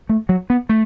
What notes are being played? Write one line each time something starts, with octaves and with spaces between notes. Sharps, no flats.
A3
F#3
B3
A3